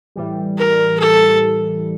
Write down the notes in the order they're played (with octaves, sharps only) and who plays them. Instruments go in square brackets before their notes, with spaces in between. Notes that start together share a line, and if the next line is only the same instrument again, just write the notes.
[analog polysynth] A2 E3 G3
[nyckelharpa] A#4
A4